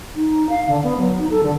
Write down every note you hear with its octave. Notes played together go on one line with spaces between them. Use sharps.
D#4
F5
D3
B3
F#3
D#4
A4
D3